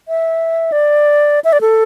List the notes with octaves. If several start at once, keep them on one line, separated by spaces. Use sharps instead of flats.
E5
D5
E5
D5
A4